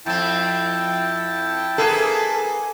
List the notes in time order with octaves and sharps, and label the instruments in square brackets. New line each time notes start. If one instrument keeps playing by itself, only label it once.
[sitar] F2 C4 [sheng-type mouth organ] E4 G5 A5
[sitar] A#3 G#4 B4 [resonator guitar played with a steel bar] A4